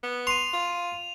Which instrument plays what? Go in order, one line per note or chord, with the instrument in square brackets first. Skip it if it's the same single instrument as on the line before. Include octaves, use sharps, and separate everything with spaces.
[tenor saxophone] B3
[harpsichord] C6 [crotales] D#7 F7
[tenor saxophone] F4